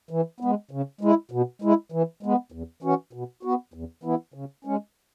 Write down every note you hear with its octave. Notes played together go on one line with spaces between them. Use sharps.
E3
G#3 B3
C#3
G#3 E4
B2
G#3 E4
E3
G#3 B3
E2
E3 C#4 F#4
B2
B3 F#4
E2
E3 B3 E4
C#3
G#3 C#4